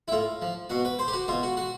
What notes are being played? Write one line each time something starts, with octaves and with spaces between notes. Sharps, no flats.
E4
A2 F4
F3
B2 F#4
B4
C5
G4
F#4
B2 F4
F#4
F#4